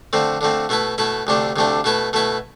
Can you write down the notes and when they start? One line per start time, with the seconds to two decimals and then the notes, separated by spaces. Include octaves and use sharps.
0.13 D3 F3 A3 C4
0.41 D3 F3 A3 C4
0.69 B2 A3 E4 B4
0.98 B2 A3 E4 B4
1.27 D2 C3 F3 A3 D4
1.56 D2 C3 F3 A3 D4
1.84 B2 A3 E4 B4
2.13 B2 A3 E4 B4